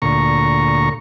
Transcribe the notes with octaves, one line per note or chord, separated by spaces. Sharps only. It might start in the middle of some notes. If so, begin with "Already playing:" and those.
D2 A#2 A#5 C#6